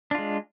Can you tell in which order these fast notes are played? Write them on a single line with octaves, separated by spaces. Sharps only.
D4 F4 G#3